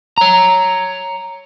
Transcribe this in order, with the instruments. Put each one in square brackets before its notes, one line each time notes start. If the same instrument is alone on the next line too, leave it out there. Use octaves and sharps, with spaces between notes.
[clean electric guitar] C#5 A#5